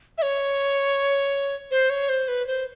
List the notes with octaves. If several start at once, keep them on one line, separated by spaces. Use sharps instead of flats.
E5
C#5
C5
C#5
C5
B4
C5